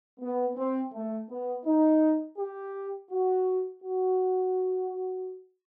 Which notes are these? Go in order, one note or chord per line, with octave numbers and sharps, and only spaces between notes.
B3
C4
A3
B3
D#4
G4
F#4
F#4